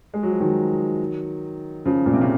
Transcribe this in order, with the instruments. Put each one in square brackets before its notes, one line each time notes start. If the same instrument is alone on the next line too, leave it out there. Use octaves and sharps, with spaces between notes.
[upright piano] G#3
F#3
F3
D#3 F#3
C#3 F3
A#2
C3
C#3